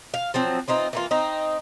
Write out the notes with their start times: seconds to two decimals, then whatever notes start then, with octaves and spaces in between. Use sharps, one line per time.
0.14 F5
0.34 F3 F#3 C4
0.68 E3 C4 D#4 F4
0.93 E3 A#3 F4
1.11 C4 D#4